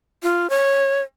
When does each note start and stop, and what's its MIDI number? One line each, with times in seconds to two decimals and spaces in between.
0.23 0.49 65
0.50 1.02 73